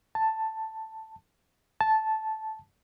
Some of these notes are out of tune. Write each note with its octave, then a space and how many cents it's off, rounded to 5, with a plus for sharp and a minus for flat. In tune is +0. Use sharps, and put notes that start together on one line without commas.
A5 +5
A5 -10